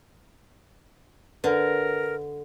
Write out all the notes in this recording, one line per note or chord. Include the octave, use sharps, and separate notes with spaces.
D3 A#4 B4